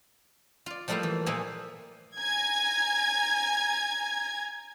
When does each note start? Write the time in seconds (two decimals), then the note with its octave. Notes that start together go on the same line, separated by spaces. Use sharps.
0.66 F4 D5
0.88 F3 G3 A3 A#3 E4 F4
1.03 E3
1.26 A#2 F3 A#3 D#5 E5 G#5
2.18 G#5 A#5 G#6